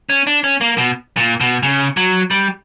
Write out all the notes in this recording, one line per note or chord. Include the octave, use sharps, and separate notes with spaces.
C#4
D4
C#4
A#3
B2
A#2
B2
C#3
F#3
G3